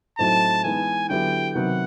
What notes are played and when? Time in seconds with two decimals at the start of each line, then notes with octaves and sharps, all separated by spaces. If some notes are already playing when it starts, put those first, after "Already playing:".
0.18 A2 F#3 A3 C4 D#4 A5
0.64 E3 G#3 B3 D#4 G#5
1.09 D3 F#3 B3 E4 G4 G5
1.55 C3 D#3 F#3 B3 F#5